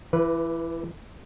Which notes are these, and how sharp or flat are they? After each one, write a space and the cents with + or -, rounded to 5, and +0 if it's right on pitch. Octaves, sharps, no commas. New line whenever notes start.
E3 +20 B4 -10